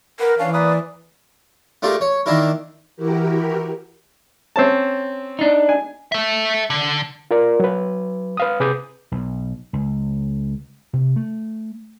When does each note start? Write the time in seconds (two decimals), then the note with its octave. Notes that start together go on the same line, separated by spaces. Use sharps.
0.20 A#4 B4 F#5
0.39 E3 C#4 D4 F5
0.54 A#3 B4 D5 D#6
1.82 A3 D4 F4 G4 G#4 A#4
2.01 C#5
2.26 D#3 A#3 D4 E4 A#4
2.97 E3 E4 F#4 G4 A#4
4.56 C4 C#4 A5
5.39 D4 D#4
5.69 G#5
6.12 A4 E5
6.70 D3
7.31 F4 A#4 D5
7.60 F#3 B4
8.37 B4 F5 D#6
8.60 C3 G#4 B4 D6 D#6 G6
9.12 B1
9.73 C#2
10.93 C3
11.16 A3